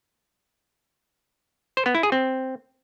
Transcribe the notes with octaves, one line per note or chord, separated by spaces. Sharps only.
C5
B3
E4
G#4
C4